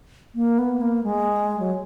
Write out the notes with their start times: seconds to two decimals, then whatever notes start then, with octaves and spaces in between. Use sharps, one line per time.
0.35 A#3
0.59 B3
0.81 A#3
1.03 G#3
1.60 F#3